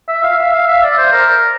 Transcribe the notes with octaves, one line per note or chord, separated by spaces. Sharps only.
E5
F5
E5
F5
E5
D5
C5
A#4